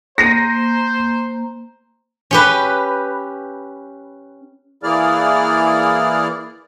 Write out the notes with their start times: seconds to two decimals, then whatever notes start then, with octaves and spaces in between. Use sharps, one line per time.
0.18 A#3 C5 A#5 A#6 C7 D#7
2.31 C#4 G4 B4
4.83 E3 A#3 E4 G#4 D5 F6